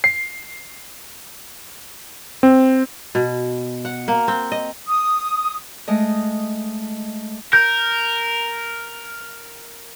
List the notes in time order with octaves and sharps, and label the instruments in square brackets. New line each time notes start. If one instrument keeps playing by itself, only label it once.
[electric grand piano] C7
C4
[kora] B2
F#5
A#3
C4
D#5
[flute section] D#6
[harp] G#3 A3 D#5
[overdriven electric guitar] A#4 [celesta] G6